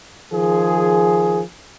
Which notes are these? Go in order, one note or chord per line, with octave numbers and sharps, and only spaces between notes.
D#3 F3 G#4